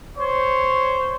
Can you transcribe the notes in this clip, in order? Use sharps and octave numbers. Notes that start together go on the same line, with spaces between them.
C5 C#5